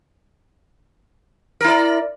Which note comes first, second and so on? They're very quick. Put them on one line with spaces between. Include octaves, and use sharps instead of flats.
A#4 E4 D5